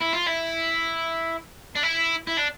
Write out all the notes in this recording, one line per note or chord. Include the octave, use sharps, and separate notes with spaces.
E4
F4
E4
D4
E4
E4
D4